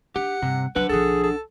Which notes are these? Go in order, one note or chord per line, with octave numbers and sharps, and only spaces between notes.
D4 G4 F#5
G2 C3
C2 F#3 D4 B4 F#5
B1 F3 G#4 A4
A4